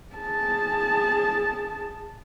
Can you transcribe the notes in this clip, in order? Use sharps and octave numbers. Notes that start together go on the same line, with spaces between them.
G#4 A5